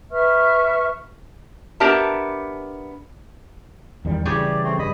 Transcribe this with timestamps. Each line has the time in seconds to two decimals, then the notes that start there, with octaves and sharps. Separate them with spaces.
0.10 B4 E5 C#6 F6
1.80 B3 D4 G4 A#4 E5 A5
4.05 E2 D#3 G3
4.26 C#3 E3 G3 G4 G#4 D5
4.64 A3 C4
4.79 G2 D#5 B5